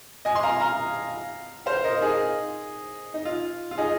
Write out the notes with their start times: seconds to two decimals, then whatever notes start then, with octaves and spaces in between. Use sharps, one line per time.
0.25 D#5 G#5
0.35 C6
0.43 F5 A#5
0.61 F5 A#5
1.66 C5 F5
1.84 A#4 D#5
2.01 D#4 G#4
3.14 D#4
3.25 F4
3.71 F4
3.78 D#4 G#4